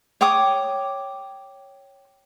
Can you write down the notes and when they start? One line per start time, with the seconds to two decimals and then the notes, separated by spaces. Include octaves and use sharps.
0.21 C#5 G5 D6 D#6